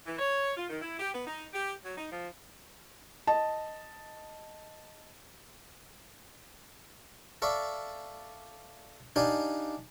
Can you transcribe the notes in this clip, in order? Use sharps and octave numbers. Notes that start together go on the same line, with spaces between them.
E3
C#5
F4
D#3
E4
G4
B3
D#4
G4
F#3
D#4
F3
D#5 A5
A4 D5 E5 F5 C#6
D4 D#4 G4 D5 F5 G#5